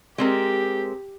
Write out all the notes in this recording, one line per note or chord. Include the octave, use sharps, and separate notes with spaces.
G#3 C4 G4 A#4